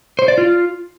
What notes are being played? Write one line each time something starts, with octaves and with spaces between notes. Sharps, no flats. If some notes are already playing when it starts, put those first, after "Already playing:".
C5
D5
F4